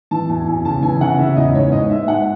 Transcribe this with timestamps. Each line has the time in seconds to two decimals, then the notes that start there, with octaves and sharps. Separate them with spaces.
0.11 E3 A5
0.29 E2 G#5
0.47 E2 G#5
0.65 C#3 A5
0.83 E3 G#5
1.00 C#3 F#5
1.19 C#3 E5
1.36 E2 D#5
1.54 G#2 C#5
1.72 G#2 D#5
1.90 G#2 E5
2.07 G#2 F#5